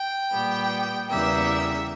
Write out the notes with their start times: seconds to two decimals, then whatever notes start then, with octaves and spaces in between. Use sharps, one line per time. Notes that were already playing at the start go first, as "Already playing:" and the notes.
Already playing: G5
0.32 A#2 G3 B3
1.09 E2 C#3 G3 A#3 E5